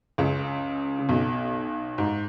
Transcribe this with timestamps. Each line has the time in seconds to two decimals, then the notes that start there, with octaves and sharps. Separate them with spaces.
0.18 C#2 C#3
0.99 C#3
1.09 B1 B2
1.98 G#2